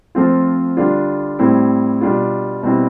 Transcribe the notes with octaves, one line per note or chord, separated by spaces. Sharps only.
F3 A3 C4 F4
D3 G3 D4 F4
A2 G3 C4 E4
B2 G3 D4 F4
B2 G3 C4 E4